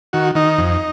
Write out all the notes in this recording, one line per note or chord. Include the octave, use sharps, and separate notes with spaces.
D#3 F#4
D#3 D#4
F2